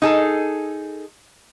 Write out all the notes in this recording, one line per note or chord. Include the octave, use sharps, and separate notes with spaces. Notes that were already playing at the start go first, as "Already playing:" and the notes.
D#4 G#4 A4